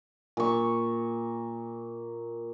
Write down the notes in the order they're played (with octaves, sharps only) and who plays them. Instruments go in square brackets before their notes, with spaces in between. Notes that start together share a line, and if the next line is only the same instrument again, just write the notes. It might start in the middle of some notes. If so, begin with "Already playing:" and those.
[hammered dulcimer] A#2 C#6